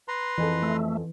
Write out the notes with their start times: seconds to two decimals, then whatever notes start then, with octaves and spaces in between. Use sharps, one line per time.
0.08 B4 A#5 C6
0.38 F2 E3 G#4 A4
0.62 A3